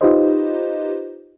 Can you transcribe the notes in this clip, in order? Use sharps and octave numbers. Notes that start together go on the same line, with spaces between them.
D#4 F4 G4 B4 C5 D#5